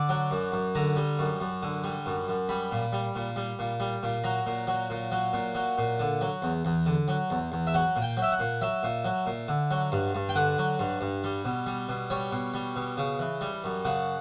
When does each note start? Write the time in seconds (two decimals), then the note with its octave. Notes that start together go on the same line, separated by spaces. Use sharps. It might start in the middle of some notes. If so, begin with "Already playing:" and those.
Already playing: D3 D5
0.09 F#3
0.31 F#2
0.52 F#2
0.75 D3 A#5
0.96 G3
1.19 F#2
1.40 F#2
1.63 D3
1.84 G3
2.06 F#2
2.28 F#2
2.49 G3 B5
2.72 A#2
2.92 G3
3.16 A#2
3.36 G3
3.59 A#2
3.80 G3
4.03 A#2
4.24 F#3 A#5
4.46 A#2
4.67 F#3
4.90 A#2
5.12 F#3
5.33 A#2
5.55 F#3
5.78 A#2
6.00 D3
6.21 F#3
6.42 E2
6.65 E2
6.86 D3
7.08 F#3
7.30 E2
7.52 E2
7.67 E5
7.74 F#3 F#5
7.96 A#2
8.02 G5
8.17 F#3
8.22 E5
8.32 F#5
8.40 A#2
8.61 F#3 E5
8.83 A#2
9.05 F#3
9.26 A#2
9.48 D3
9.71 F#3
9.92 G2
10.15 G2
10.29 G5
10.35 D3 F#5
10.58 F#3
10.79 G2
11.01 G2
11.24 G3
11.45 B2
11.66 G3
11.89 B2
12.10 G3 C#5
12.32 B2
12.54 G3
12.76 B2
12.97 C#3
13.19 E3
13.41 G3
13.64 F#2
13.85 C#3 F#5